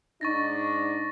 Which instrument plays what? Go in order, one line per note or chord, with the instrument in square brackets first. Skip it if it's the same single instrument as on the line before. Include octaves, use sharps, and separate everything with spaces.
[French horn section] G#2 D4 D#4 [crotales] C#6 A6 A#6